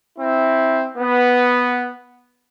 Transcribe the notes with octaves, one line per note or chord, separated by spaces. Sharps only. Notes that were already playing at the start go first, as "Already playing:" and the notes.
C4 E4
B3